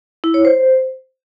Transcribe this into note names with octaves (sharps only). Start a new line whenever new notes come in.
E4
C#5
C5